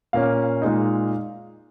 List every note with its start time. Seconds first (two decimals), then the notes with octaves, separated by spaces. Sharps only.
0.13 A#2 A#3 C#4 F5
0.62 A#2 G#3 D#4